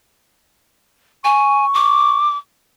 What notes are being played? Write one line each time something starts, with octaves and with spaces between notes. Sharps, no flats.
G#5 C#6
D6